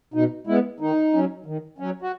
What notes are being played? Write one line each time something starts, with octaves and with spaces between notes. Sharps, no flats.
B2 D#4
G#3 B3 E4
D#3 D#4
F#3 C#4
D#3
F#3 C#4
F#4